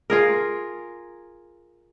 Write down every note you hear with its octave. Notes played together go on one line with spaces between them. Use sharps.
F4 G#4 A#4